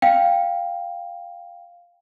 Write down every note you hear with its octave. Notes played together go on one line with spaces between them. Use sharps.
F5 G5